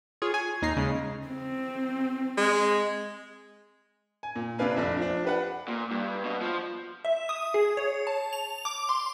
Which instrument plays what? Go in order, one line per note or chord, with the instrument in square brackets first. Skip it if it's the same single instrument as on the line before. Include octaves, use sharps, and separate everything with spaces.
[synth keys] F4 G#4 C#5
G#5
D#2 D#4 A#5 C7
C#3 G#3
[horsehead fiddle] C4
[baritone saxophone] G#3
[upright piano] G#5
A#2
C3 D4 B4 F5 G#5
F1 A#1 D4
F3 D4
G4 B4 F#5
[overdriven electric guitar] A#2
G2
B2
F3
[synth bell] E5
D#6
G#4
C#5
A5
F7
D6
C6